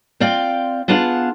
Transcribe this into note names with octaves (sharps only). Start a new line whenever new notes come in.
C4 F4 D5 F5 G5
B3 D4 F4 G#4 F5 F#5